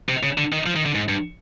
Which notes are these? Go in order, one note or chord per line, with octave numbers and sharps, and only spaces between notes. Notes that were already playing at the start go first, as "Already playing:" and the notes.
C3
C#3
D3
D#3
F3
D#3
D3
G#2
G2